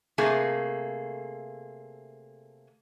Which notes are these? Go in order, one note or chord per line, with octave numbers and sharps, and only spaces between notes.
C3 A3 A#3 G#4